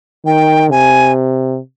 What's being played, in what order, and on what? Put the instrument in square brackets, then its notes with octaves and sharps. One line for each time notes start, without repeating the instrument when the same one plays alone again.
[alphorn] D#3 [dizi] G5
[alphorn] C3 [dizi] G#5